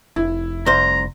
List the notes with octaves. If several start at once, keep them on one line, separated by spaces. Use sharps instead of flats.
F1 E4
C2 C5 A#5